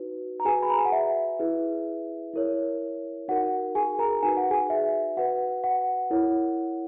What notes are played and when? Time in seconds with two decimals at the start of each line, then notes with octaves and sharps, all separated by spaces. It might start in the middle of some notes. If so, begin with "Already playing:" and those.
Already playing: D#4 F#4 B4
0.40 A#5
0.45 F#4 G#4 B4 G#5
0.63 B5
0.70 A#5
0.78 G#5
0.85 F#5
0.92 E5
1.39 E4 G#4 B4
2.33 E4 A#4 C#5
3.28 D#4 F#4 A#4 F#5
3.75 G#4 G#5
3.99 A#4 A#5
4.23 D#4 F#4 B4 G#5
4.37 F#5
4.50 G#4 G#5
4.70 E5
5.17 F#4 B4 F#5
5.64 F#5
6.10 E4 A#4 C#5